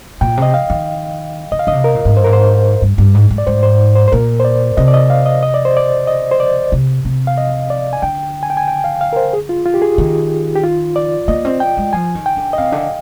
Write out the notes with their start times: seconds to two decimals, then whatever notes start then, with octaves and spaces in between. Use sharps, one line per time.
0.21 A#2 G5
0.37 C3 D#5
0.54 F5
0.70 D#3
1.52 D3 D#5
1.59 F5
1.67 D3 D#5
1.73 C3
1.84 A#4
1.95 A#2
2.05 G#2
2.16 G2 C5
2.24 G#2 A#4
2.33 C5
2.82 G2
2.98 G2
3.14 G#2
3.31 G#2
3.38 D5
3.47 G#2 C5
3.63 C5
3.96 C5
4.08 C5
4.12 A#2 A#4
4.40 C5
4.44 D5
4.77 C3 D#5
4.88 D5
4.94 D#5
5.10 F5
5.26 D#5
5.43 D#5
5.54 D5
5.65 C5
5.77 D5
6.07 D#5
6.31 C5
6.40 D5
6.72 C3
7.05 C3
7.27 F5
7.38 D#5
7.70 D5
7.93 G#5
8.02 D3 G5
8.43 G#5
8.50 G5
8.57 G#5
8.68 G5
8.84 F5
9.01 F5
9.13 A#4
9.16 C5
9.33 G#4
9.49 F4
9.65 F4
9.74 G4
9.82 G#4
9.98 D#3
10.56 G4
10.64 F4
10.96 D5
11.28 A#3 D#5
11.45 C4
11.60 G5
11.77 G#3
11.93 F3 G#5
12.15 D#3
12.26 G5
12.37 D3
12.53 D#5
12.58 C3 F5
12.72 D3